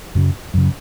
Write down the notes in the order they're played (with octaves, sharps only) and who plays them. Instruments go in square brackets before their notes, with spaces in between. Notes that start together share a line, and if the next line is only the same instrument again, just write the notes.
[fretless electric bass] F#2 C#3 F#3
F#2 C#3